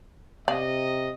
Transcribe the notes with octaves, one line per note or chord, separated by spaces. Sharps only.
C3 D5 D#5 F5